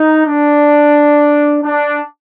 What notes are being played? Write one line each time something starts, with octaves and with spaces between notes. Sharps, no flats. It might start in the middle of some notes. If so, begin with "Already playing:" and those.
Already playing: D#4
D4
D4